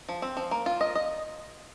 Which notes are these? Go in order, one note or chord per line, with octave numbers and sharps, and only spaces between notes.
F3
C4
F3
A#3
F4
D#5
D#5